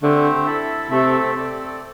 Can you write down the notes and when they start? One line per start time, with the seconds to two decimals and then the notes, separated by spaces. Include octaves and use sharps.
0.02 D3 A3 C4 G4 C5
0.46 E4 A4 E5
0.90 C3 A3 C4 A4 E5
1.35 C4 A4 D5